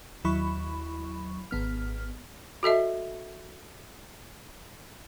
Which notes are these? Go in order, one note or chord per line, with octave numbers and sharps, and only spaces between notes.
D#2 F#3 E4 B5 C#6
G#1 B3 F6
F#4 A4 D#5 E5